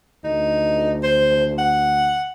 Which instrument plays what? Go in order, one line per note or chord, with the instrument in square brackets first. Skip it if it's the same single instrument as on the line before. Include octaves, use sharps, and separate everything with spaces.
[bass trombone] D2 [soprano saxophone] D#4
[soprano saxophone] C5
F#5